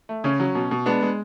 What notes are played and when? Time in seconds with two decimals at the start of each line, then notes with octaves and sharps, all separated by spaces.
0.09 A3
0.24 C#3 C#4
0.40 F#3
0.55 B2
0.71 B2
0.86 G#3 B3 D4
1.03 G#3